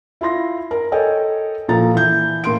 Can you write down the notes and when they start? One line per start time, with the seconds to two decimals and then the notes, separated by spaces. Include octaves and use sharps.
0.21 E4 F4 C6 A#6
0.71 A#4
0.92 A4 C#5 D#5 G5 G#5
1.68 A#2 F3 A4 A#5 A6
1.94 E3 G6
2.44 A2 A#3 C6 D7